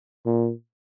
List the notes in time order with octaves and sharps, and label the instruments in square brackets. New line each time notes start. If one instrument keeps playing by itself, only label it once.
[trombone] A#2